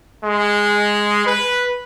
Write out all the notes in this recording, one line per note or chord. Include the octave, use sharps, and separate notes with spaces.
G#3
B4